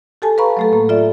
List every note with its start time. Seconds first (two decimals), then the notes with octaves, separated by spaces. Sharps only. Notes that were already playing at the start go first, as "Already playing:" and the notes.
0.22 G4 A4 G#5 A5
0.38 B4 F5 A#5 B5 C#6
0.57 F#3 A3 A4
0.71 A2 A#3
0.89 F4 A4 D5 E5